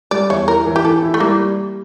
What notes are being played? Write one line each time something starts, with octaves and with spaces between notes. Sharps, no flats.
G3 D5
E2 C#5
E4 A#4
E3
G4
E3 A4
E4
A3
G3 A#3